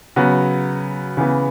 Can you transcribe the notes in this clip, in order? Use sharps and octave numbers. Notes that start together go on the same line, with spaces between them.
C#3 F#3 B3 F#4
C#3 E3 B3